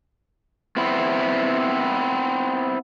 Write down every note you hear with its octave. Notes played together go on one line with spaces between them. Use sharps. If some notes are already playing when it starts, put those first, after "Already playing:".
B3 C4 E4